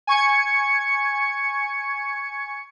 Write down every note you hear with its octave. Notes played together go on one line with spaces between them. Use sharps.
G#5 C#6 G#6 C#7